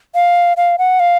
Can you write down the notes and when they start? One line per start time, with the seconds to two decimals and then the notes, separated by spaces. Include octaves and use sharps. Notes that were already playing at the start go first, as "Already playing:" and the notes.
0.15 F5
0.57 F5
0.78 F#5
1.00 F5